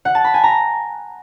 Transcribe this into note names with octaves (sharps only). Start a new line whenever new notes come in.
F#5
A5
B5
G#5
A#5